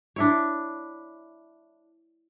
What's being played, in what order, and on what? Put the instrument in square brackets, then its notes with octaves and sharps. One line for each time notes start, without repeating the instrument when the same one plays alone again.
[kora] D4 E4 C#5